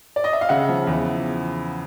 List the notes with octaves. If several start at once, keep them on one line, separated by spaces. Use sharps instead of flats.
D5
D#5
E5
F5
C#3 E5 F#5
F3
E2